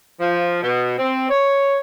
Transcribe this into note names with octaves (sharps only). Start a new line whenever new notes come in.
F3
B2
C4
C#5